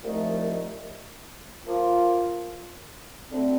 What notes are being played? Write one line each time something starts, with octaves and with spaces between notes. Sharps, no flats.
C2 A#2 F3 A3 D#4
F3 A#3 F4
D2 D3 A3 C4